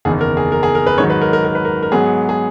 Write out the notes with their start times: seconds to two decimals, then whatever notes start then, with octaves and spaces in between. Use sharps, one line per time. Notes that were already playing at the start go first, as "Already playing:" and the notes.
0.05 F#1 E2 D#3 G#4
0.21 A#4
0.37 G#4
0.52 A#4
0.63 G#4
0.75 A#4
0.87 B4
0.98 G#2 D#3 F#3 C#5
1.10 B4
1.21 A#4
1.33 A#4
1.45 A#4
1.55 B4
1.65 A#4
1.83 A#4
1.92 G#2 F#3 B3 G#4
2.29 G#4